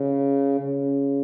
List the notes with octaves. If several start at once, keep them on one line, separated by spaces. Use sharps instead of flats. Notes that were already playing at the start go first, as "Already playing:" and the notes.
Already playing: C#3
C#3